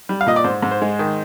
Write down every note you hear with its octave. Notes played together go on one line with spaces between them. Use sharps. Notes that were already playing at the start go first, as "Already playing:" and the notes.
G3
F5
A#2 D#5
D5
G#2 C5
G#2
C5
G#3
D#3